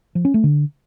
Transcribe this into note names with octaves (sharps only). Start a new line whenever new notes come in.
F3
C#4
A3
D3